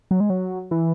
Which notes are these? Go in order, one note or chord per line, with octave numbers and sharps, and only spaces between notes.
F#3
G#3
F#3
E3